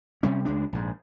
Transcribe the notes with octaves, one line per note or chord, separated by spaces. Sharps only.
C3 G3 C#4
C#2 G#3 D4
A#1 G#2